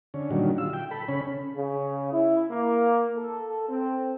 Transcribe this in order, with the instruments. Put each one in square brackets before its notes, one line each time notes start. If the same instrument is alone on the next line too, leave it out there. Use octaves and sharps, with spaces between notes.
[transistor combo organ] D3 C#4
A#2 D3 D#3 F#3 G3
F4 E6
G5
A4 B5
C#3 C#4 B5
[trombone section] C#3
E4
A#3
A4
C4